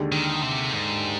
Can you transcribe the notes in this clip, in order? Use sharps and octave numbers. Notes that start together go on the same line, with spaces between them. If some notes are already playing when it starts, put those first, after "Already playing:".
Already playing: D#2 D3 G#3 D4 G4
D#3
C3
G#2